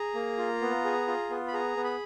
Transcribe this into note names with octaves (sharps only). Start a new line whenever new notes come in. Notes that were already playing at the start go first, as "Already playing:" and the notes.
Already playing: G#4 A#5
A#3
F4
B3
G#4
F4
B3
B5
G#4 A#5
B3
B5